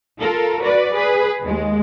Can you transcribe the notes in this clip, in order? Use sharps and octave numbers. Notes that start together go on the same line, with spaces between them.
F4 A4 A#4
F#4 B4 D5
G#4 B4
D#2 G#3